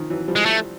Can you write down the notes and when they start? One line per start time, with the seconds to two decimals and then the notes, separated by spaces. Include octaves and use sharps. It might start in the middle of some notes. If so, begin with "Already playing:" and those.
Already playing: D#3 F3
0.10 E3 F#3
0.28 F3 G3
0.36 G#3
0.46 A3